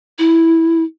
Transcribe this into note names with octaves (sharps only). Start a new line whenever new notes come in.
E4